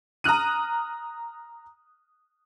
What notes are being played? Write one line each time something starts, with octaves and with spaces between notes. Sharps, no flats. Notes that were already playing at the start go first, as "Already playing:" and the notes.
A#5 D#6 F6 F#6 D#7